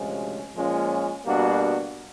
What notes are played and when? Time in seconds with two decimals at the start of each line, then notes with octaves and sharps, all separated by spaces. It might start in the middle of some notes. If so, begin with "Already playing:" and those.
Already playing: D2 C3 F3 G#3 C#4
0.55 A#2 F3 G#3 C#4 F4
1.26 B2 G3 A#3 D4 F#4